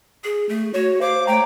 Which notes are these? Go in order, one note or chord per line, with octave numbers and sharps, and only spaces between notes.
G#4
A3
F#4 C#5
C5 F5 D6
A3 C#5 G5 A#5